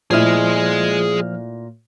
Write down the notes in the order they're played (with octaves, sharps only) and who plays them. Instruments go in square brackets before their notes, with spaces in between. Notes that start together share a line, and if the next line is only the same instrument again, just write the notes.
[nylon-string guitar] A#2 A3 E4 [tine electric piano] F3 F6 [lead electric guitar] G#4 D#5